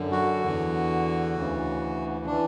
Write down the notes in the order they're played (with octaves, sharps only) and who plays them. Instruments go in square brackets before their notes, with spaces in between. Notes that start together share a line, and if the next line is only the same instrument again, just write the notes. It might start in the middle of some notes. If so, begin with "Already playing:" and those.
Already playing: [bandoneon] F#2 D3
F#4
E2 D3
D2 C#3 E3
E3 D4